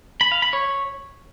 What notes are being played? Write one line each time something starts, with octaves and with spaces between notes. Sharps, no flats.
B5
F5
B5
C#5